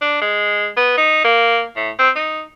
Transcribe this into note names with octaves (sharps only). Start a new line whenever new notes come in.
D4
G#3
B3
D#4
A#3
A2
C4
D#4